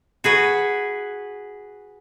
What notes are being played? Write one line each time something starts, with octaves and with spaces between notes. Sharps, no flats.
F#4 G#4 B4